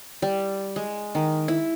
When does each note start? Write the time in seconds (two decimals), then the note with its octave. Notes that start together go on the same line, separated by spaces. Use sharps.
0.22 G3
0.76 G#3
1.15 D#3
1.48 E4